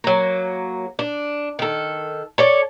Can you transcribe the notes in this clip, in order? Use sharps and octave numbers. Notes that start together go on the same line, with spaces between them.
F#3 A#3
D4
D#3 A4
A4 C#5 D5